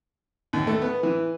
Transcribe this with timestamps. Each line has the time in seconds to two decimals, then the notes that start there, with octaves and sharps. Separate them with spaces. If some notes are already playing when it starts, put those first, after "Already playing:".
0.53 D#2
0.67 A3
0.82 B3
1.03 E3